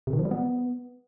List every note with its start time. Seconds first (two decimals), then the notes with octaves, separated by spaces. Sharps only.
0.07 C3
0.13 D#3
0.19 F3
0.25 G3
0.31 B3